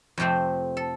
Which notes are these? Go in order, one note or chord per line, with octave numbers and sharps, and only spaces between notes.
F2 C3 A3 C4 G4 C5
A4